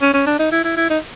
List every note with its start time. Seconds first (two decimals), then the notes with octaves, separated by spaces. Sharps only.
0.01 C#4
0.14 C#4
0.26 D4
0.39 D#4
0.52 E4
0.64 E4
0.77 E4
0.90 D#4